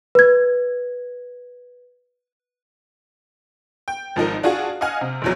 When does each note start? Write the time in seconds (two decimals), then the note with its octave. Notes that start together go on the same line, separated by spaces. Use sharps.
0.15 B4 G#6
3.88 G5
4.16 G#1 F3 D#4 A#4
4.43 D4 F4 F#4 G#4
4.81 D#5 F5 F#5 G#5 F6
5.01 C3
5.22 A#1 E2 F#3